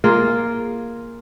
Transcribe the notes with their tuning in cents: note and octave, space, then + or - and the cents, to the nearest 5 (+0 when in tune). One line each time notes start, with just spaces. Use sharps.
A#3 +0 F4 +0 G#4 +0